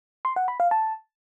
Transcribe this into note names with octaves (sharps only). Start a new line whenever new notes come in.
C6
F#5
B5
F5
A5